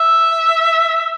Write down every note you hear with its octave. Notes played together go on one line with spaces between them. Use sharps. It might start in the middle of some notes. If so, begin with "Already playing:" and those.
Already playing: E5